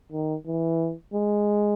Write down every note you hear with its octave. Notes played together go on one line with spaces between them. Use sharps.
D#3
E3
G#3